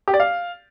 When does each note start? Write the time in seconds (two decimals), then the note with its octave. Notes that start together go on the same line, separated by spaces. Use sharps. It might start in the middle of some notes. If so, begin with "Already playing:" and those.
0.08 G4
0.14 D5
0.20 F5